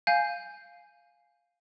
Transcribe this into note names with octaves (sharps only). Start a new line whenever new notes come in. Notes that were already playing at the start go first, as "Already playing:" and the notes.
F5 G#5 G6